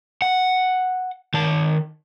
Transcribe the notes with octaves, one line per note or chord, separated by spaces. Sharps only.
F#5
D#3 A5